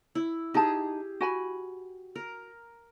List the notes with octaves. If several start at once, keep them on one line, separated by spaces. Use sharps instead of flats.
E4
D#4 G4 G#4 A5
F#4 G#5 B5
A#4